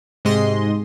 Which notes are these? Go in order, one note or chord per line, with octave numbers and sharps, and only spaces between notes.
G#2 C3 G#3 D#5 C6